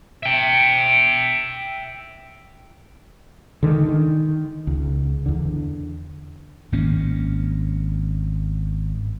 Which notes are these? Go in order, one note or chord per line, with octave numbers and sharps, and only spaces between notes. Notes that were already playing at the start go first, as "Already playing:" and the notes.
E5 G5
D3 D#3 G#3
D#3
C#2
E2 D3
G#1 A#3 C#4